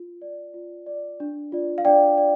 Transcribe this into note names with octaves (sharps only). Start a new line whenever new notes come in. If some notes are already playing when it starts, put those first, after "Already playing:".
Already playing: F4
D5
F4
D5
D4
F4 D5
F5
D4 D5 G5
D5